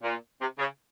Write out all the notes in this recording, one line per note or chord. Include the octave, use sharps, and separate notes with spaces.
A#2
C3
C#3